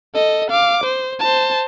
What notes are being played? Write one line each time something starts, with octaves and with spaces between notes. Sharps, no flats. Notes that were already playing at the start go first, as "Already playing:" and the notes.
A4 D#5
F5 D6
C5
C5 A5